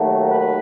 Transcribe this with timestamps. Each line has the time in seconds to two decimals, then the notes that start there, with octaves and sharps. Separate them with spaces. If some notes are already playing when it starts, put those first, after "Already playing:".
Already playing: D#2 D#3 F#3 A3
0.30 B4